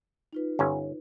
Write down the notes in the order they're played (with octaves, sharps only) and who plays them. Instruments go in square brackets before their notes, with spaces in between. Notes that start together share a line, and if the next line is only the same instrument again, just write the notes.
[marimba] D#4 F4 B4
[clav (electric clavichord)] G1 C#4